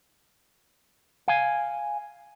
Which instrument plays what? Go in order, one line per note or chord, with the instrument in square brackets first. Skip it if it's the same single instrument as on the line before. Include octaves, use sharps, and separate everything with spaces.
[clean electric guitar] F5 G#5